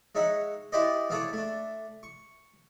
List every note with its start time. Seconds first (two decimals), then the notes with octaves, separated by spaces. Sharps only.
0.15 G#3 D#4 C#5 E5 F#5
0.72 E4 G4 B4 C5 D5 D#5
1.10 E3 F4 G#4 A4 C#5 D5
1.33 A3 D4
2.03 C#6